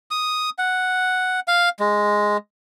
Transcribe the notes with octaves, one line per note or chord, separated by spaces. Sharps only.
D#6
F#5
F5
G#3